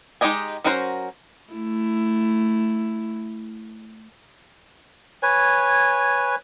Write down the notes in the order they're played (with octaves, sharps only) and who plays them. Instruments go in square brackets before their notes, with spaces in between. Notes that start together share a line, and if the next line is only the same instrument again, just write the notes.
[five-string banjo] G#3 D#4 G4 D#5 G#5
F#3 C#4 F#4 A#4 C5
[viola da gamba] A3 E4
[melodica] B4 C#5 G#5